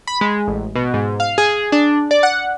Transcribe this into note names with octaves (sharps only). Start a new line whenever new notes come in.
B5
G#3
A1
B2
G#2
F5
G#4
D4
D5
F#5